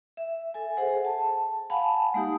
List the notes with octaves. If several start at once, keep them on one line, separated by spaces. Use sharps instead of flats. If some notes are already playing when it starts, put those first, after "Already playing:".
E5
A4 G#5
G#4 C5 F#5
A5
F5 F#5 G#5 A5 B5
G#3 A#3 D#4 G4 D#6